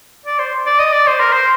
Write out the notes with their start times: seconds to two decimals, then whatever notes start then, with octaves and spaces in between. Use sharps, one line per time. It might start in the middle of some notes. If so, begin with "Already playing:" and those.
0.26 D5
0.39 C5
0.66 D5
0.79 D#5
0.93 D5
1.07 C5
1.20 A#4
1.33 C5